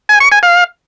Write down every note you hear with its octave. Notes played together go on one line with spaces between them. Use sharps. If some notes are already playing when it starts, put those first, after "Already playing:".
G#5
C#6
G#5
F5